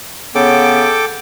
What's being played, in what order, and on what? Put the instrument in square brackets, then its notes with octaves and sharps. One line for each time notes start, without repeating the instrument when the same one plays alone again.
[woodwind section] C#3 B3 [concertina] A4 G5 D6